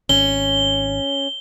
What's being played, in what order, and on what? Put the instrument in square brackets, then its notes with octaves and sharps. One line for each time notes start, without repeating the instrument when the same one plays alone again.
[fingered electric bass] G#1 [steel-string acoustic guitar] C#4 [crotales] G7